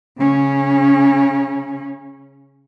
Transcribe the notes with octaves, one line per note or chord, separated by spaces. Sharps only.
C#3 C#4